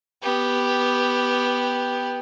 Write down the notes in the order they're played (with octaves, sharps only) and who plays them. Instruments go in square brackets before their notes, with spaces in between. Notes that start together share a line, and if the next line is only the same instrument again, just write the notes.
[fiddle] B3 G4